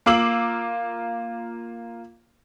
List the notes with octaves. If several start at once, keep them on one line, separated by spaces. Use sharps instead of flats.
A#3 F4 D6 E6 C7 F#7